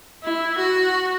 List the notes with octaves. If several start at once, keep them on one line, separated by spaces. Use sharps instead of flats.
E4
F#4